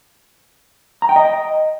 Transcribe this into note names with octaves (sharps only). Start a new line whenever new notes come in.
A#5
G5
D#5